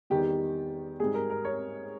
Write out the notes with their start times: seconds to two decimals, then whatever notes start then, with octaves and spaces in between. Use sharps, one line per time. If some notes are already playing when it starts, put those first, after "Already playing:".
0.10 E2 D#3 G3 G4
1.00 G#2 G3 G#4
1.14 A#4
1.30 A#4
1.45 C#5